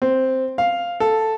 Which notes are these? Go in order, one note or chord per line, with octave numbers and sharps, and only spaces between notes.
C4
F5
A4